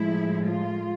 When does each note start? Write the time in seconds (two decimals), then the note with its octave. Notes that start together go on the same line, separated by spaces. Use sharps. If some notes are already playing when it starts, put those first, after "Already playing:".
Already playing: A2 F3 G#3 E4
0.45 F4